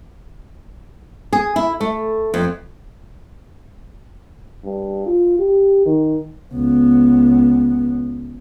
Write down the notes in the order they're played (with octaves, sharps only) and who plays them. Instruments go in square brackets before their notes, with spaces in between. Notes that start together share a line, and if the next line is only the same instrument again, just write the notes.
[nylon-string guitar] G#4
E4
A3
F2
[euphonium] G2
F4
G4
D#3
[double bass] C#2 B3